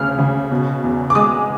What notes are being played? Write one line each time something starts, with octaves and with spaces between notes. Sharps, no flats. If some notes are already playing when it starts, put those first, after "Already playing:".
Already playing: D2 C#3 F6
C#3
B2
E2
D6
G#3 D#6